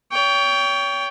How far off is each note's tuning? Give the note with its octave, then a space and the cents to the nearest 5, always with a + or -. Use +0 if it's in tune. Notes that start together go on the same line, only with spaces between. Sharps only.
C#5 +35 G5 +0